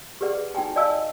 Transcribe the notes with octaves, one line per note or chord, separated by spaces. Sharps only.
G4 G#4 B4 D5 F#5
D#4 F#4 G5 G#5
D5 D#5 F5 G#5 A5 E6